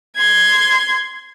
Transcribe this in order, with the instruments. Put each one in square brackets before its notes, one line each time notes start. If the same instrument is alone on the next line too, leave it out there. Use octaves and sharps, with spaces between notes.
[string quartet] C6 G#6